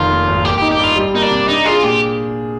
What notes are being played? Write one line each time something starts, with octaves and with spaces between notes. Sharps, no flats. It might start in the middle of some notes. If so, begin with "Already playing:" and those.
Already playing: F1 D#3 F4
A#3
G#1
A#3 G4
D#4 G4
G4
G2 F4
G3
A#3 D#4
D4
C3
D4 D#4
F4 G#4
A#2 G4